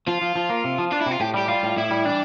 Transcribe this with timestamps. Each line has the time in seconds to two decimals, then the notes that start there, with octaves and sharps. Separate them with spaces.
0.07 F3 F4
0.22 F3
0.36 F3
0.49 A#3
0.64 C3
0.78 F3
0.92 D4 F4
1.01 E4
1.06 C3 F4
1.20 A2 G4
1.34 G3 G4
1.48 G3 F4
1.63 A2
1.77 A2 E4
1.91 G3
2.04 E3 D4